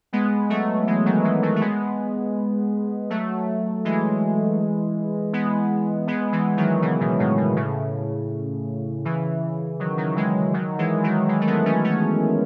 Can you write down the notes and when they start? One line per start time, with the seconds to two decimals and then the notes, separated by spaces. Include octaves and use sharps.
0.13 G#3 B3
0.49 F#3 A3
0.87 E3 G#3
1.06 D#3 F#3
1.24 E3 G#3
1.43 F#3 A3
1.56 A3
1.61 G#3 B3
3.10 F#3 A3
3.85 E3 G#3
5.33 G#3 B3
6.07 G#3 B3
6.33 E3 G#3
6.57 D#3 F#3
6.82 C#3 E3
7.01 B2 D#3
7.19 A2 C#3
7.37 B2
7.56 A2 C#3
9.05 C#3 E3
9.79 D#3 F#3
9.98 D#3 F#3
10.16 E3 G#3
10.54 D#3 F#3
10.78 E3 G#3
11.04 D#3 F#3
11.28 E3 G#3
11.41 A3
11.47 G#3 B3
11.65 A3 C#4
11.84 A3 C#4